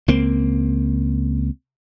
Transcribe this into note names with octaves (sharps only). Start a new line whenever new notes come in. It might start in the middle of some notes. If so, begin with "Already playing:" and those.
C#2 A#3 C4